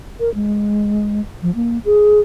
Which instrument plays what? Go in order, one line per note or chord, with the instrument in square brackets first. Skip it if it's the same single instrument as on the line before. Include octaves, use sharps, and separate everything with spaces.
[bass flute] A#4
G#3
F3
A#3
G#4